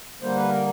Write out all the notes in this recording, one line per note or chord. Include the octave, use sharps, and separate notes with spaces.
D3 G3 A#3 C5
B4
A#4